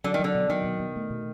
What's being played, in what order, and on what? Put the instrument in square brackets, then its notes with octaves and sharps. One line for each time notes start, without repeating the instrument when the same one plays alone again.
[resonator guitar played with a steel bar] D3 [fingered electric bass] F#3
[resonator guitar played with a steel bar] D#3
[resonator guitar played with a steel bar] D3 [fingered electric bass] F#3
[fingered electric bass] B2
[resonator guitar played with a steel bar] D#3 [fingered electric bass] F#3
[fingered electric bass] B2
B2
A3
B2